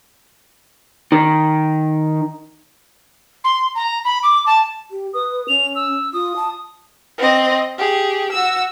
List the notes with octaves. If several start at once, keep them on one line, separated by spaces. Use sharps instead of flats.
D#3
C6
A#5
B5
D6
A5
G4
B4 D#6
C#4 F7
E6
F4 D#6
A5
C4 D#5
G4 G#4
F#4 E6